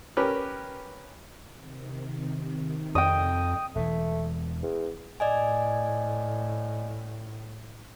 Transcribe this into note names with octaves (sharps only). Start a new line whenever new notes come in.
C#4 G4 A#4 B4
C3 D#3
F2 D#5 G5
E1 E3 A3
E2
A2 D5 D#5 G#5